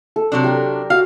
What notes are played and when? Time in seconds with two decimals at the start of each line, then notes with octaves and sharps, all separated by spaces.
0.16 A4
0.32 C3 F#3 D4
0.44 G4 A#4
0.90 F#4 F5